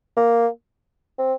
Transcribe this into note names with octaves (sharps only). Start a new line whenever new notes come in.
A#3
C4